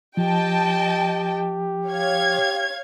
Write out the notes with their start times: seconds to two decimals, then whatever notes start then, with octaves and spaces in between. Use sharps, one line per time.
0.17 F3 G4 D#5 G5 A5
1.88 C#5 F5 G#6